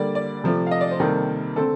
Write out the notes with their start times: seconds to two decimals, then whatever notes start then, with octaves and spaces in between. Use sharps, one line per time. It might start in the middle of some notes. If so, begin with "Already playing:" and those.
Already playing: D3 G3 A#3 D5
0.15 D5
0.44 C3 F3 A3
0.67 F5
0.71 D#5
0.81 D5
0.91 C5
1.00 C3 D#3 G3 A#3 A4
1.56 D3 A3 C4 A4